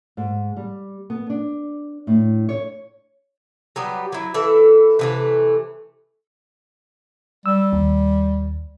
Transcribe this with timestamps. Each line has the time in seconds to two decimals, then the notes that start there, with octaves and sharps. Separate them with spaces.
0.17 G#2
0.56 G3
1.10 B3
1.30 D4
2.07 A2
2.49 C#5
3.76 F#3 G3 B3 G4
4.12 F#3 E4
4.34 E3 A4 E5
4.99 C3 E3 A3
7.46 G3 E6
7.73 D#2